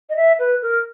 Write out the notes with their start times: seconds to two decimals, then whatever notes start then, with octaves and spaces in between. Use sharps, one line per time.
0.09 D#5
0.16 E5
0.39 B4
0.62 A#4